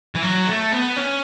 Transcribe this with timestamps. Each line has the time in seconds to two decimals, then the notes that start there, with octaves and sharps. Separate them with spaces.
0.15 E3
0.22 F#3
0.47 A3
0.72 B3
0.97 C#4